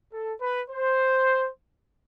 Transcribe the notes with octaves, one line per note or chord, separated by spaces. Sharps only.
A4
B4
C5